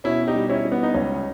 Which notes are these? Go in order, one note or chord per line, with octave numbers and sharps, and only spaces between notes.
B2 C#4 E4
D#4 G4
G3
C#4 E4
G3
B3
D#4
C#2 C#4